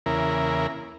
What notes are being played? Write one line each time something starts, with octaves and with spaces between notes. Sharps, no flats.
E2 C#3 A#3 E4 A#4